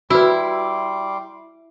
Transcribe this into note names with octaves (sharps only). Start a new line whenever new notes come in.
G3 E4 F#4 B4 C6 D6